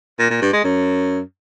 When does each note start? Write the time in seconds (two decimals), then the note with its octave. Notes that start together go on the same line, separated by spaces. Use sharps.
0.19 A#2
0.30 A#2
0.42 G2
0.53 G#3
0.64 F#2